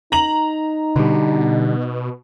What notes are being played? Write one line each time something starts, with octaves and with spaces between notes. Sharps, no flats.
D#4 A#5 F#7
B2 D3 G3